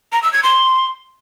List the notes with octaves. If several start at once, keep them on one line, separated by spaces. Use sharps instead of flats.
A#5
E6
G#6
C6